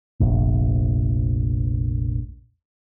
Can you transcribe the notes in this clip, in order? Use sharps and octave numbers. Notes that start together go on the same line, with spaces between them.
F1 A#1